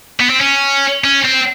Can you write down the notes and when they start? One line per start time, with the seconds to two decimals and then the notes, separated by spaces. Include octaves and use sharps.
0.20 B3
0.30 C4
0.41 C#4
1.04 C#4
1.24 C4